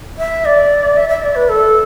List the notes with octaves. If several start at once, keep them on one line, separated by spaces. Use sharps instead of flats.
E5
D5
E5
E5
D5
B4
A4